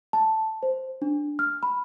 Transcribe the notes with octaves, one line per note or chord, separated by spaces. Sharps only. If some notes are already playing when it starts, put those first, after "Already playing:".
A5
C5
D4
F6
B5